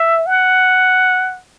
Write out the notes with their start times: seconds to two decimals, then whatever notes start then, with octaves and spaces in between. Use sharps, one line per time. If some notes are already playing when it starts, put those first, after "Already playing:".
Already playing: E5
0.27 F#5